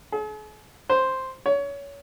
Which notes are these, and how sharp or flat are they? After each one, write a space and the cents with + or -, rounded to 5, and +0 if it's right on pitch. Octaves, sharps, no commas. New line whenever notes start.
G#4 +45
C5 +0
C#5 +25